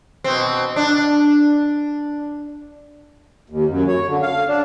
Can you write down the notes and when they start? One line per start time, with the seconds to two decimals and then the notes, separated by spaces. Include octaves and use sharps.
0.24 B2 C4
0.76 D4
3.50 D#2
3.68 F#2
3.88 C#5
4.07 D3
4.22 F5
4.47 D4